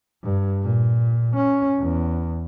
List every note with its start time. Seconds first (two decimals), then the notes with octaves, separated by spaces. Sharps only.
0.23 G2
0.63 A#2
1.37 C#4
1.80 E2